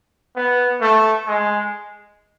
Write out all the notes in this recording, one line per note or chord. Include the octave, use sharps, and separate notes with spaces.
B3
A3
G#3